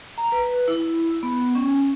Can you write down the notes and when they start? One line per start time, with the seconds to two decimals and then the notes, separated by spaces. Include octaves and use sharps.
0.18 A#5
0.32 B4
0.68 E4
1.23 B3
1.55 C#4